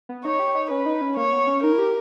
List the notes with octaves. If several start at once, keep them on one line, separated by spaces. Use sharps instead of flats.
B3
D#4 C#5
G4
D#4
C#4 B4
D#4
C#4
A#3 C#5
B3
C#4
D#4 A#4
E4
G4